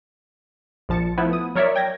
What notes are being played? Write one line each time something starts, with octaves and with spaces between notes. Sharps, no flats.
A#1 F3 A5 A6 C#7
F3 A3 B3 E4
D#6
F#3 A#4 C#5 D5 E5
G5 G#6 A#6